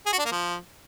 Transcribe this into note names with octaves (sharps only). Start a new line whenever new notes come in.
G#4
F#4
D4
A#3
F3